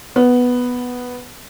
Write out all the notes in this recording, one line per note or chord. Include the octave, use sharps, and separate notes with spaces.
B3